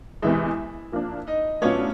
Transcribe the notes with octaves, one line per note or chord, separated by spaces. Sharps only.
E2 C3 E3 G#3 E4 E5
F3 A#3 D4
D#4 D#5
A2 F#3 B3 C#4 D4 F4 C#5